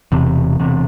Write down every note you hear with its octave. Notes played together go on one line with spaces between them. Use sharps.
E1 E2 C3
E1 E2 C3